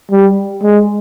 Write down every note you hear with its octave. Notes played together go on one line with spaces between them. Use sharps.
G3
G#3